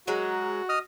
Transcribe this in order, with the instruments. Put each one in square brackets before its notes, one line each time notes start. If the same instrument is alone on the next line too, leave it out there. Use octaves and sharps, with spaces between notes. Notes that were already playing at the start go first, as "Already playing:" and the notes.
[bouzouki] F#3 G#3 A#4 [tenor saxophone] F#4
[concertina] D#5 D#6 F6